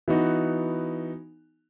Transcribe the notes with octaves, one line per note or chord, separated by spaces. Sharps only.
E3 B3 D#4 F#4